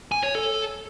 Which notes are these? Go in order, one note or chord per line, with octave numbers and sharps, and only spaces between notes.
G#5
C#5
A4